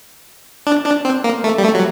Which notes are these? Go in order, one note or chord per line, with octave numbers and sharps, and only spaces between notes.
D4
D4
C4
A#3
A3
G3
A3
F#3